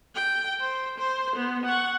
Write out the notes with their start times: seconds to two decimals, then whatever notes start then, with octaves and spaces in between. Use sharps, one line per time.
0.15 G5
0.60 C5
0.98 C5
1.36 B3
1.66 F#5 C#6